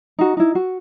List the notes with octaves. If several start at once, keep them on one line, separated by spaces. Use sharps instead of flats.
D#4 F#4
D#4 E4
F#4